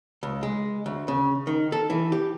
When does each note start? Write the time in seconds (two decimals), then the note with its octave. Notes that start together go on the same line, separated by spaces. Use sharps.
0.23 C#2
0.43 G#3
0.86 D2
1.08 C#3
1.47 D#3
1.72 A4
1.90 E3
2.12 G4